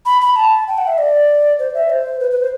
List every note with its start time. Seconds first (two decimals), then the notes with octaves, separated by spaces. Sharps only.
0.06 B5
0.21 B5
0.36 A5
0.68 G5
0.78 F#5
0.88 E5
0.98 D5
1.59 C5
1.74 E5
1.90 C5
2.20 B4
2.31 B4
2.42 C5